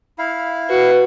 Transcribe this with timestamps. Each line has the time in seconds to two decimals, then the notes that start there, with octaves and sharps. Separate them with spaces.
0.19 E4 F5
0.70 F#4 B4